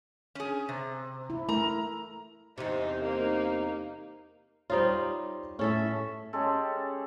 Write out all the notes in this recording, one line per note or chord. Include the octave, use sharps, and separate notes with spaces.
C#4 G#4
C3
E4
A3 E4 A#4 A#5
E2 C3 D#4 C5
A#3 D#4
G3 D#4 F4 C5 C#5
A2 C#4 A4 E5
G#3 C#4 G4 A4